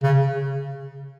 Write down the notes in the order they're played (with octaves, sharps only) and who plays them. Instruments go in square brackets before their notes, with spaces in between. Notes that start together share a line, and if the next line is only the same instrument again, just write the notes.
[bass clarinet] C#3